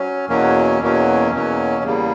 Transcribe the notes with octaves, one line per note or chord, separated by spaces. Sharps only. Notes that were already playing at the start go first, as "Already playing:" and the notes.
Already playing: F#3 C#4
E2 B2 F#3 A#3 C#4
E2 B2 F#3 A#3 C#4
E2 B2 F#3 A#3 C#4
E2 C#3 G3 A#3